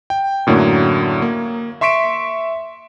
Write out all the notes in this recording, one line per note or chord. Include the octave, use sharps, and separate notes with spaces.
G5
F#2 A2 D3 F#3 A#3
A#3
E5 C6 C#6 B6 D7 E7